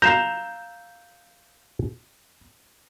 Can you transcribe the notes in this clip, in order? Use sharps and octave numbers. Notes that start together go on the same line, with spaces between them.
F5 A#5 G6 E7